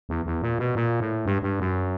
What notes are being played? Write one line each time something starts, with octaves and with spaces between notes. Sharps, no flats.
E2
E2
A#2
B2
A#2
A2
G2
G2
F#2